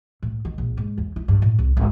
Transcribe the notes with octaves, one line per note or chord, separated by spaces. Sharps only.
A2
D#3
A#1
G#2
E2
E4
G2
A2
C2
G#1